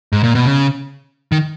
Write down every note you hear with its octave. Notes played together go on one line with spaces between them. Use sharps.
G#2
A#2
B2
C#3
D#3